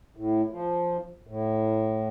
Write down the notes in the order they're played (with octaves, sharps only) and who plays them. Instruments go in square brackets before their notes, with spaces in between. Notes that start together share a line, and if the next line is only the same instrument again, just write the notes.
[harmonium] A2
F3
A2